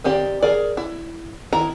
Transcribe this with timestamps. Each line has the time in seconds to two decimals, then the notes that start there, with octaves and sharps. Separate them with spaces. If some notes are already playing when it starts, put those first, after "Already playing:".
0.04 D#3 C4 G4 D5
0.42 G#4 A#4 D5
0.77 E4
1.53 D#3 E4 A#5